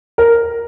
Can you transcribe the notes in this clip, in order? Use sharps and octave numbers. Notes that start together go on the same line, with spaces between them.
A#4